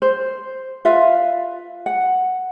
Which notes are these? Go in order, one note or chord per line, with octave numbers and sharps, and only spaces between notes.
C5
F4 B4 E5 F5
F#5